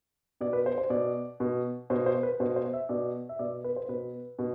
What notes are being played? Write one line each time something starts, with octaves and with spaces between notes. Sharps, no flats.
B2 D5
B4
C5
C5
B2 D5
B2
B2 C5
C5
B4
B2 C5
C5
E5
B2 D5
E5
B2 D5
B4
C5
B2 B4
B2